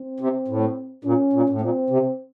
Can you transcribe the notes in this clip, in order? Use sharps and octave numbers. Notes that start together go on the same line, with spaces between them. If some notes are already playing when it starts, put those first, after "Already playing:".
Already playing: C4
C3
A2
A#2 C#4
A#2
A2
A#2 C4
C3